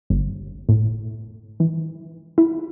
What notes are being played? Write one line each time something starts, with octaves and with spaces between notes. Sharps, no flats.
G1
A2
E3
E4